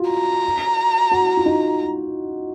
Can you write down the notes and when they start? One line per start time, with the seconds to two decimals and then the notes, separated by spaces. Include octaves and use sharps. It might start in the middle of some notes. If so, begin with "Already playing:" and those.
Already playing: F4 F#4
0.10 A#5
1.11 F#4
1.37 F4
1.46 D#4